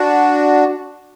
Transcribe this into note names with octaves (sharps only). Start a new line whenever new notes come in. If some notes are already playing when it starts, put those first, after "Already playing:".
Already playing: D4 F#4